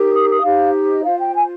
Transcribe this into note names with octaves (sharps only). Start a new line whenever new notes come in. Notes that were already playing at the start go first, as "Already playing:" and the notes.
Already playing: D#4 G4 A#4
D#6
D#6
D#4 G4 C5 F5
D#5
F4 C5 F5
G5
G#5